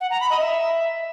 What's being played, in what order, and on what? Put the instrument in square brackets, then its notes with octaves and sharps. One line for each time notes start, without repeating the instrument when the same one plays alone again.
[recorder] F#5
A#5
B5
D#5
E5